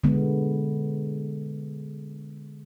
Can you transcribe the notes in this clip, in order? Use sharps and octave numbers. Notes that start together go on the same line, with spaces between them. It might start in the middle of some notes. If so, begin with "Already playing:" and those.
D3 G#3 B3